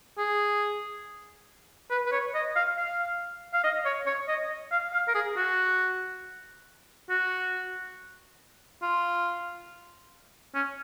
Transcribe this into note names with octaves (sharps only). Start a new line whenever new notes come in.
G#4
B4
B4
C#5
D#5
F5
F5
F5
D#5
C#5
C#5
D#5
F5
F5
A#4
G#4
F#4
F#4
F4
C#4